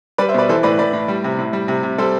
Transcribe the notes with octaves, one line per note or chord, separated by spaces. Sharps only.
G3 B4 D5
C5 E5
B2 B4 D5
E3 A4 C5
A2 B4 D5
A2 B4 D5
A2
G3
C3
A2
G3
C3
C3
G3 A4 C5